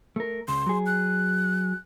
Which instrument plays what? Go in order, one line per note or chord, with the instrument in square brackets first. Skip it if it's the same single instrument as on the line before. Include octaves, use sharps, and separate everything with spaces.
[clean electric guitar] A3 A#4
[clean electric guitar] C#2 [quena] C6
[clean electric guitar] F#3 G#4
[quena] F#6